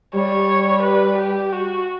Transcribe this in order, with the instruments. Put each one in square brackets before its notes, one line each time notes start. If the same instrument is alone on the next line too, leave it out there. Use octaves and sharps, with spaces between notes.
[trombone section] G3 [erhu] C#5
[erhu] B4
G4
F#4